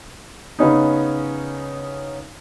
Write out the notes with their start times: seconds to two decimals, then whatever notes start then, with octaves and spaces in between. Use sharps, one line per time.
0.59 C#3 B3 C#4 D#4